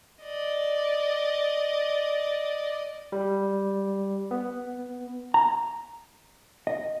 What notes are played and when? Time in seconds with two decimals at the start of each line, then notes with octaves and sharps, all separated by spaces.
0.24 D5 D#5
3.12 G3
4.31 B3
5.34 A#5
6.67 D#5